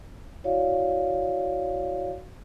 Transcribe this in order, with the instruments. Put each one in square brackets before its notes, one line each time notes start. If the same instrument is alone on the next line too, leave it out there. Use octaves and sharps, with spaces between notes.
[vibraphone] E4 F#4 C#5 D5 F5